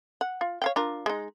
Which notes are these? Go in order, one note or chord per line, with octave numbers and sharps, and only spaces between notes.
F#5
F4
C#5 F5 G5
D4 F4 A#4
G#3 D#4